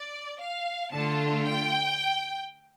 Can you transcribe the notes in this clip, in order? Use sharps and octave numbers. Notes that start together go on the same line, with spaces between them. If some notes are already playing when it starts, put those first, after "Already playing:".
Already playing: D5
F5
D3 A3 F4 A5
G5